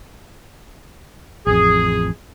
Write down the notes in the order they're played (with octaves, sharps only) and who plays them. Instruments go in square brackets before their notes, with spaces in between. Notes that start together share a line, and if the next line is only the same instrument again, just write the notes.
[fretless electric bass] A1 F2 [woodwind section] G#4